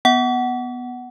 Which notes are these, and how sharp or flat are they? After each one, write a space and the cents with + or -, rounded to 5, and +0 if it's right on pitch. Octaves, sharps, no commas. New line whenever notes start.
B3 +0 F#5 +15